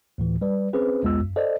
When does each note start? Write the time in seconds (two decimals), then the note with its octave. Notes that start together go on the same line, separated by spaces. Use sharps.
0.18 D2 A2 E3
0.41 G3 B4 D5
0.73 C4 C#4 G#4 B4 C5
1.03 B1 E2 G#3 B3 F4 E6
1.20 F#2
1.36 A4 C5 D5 D#5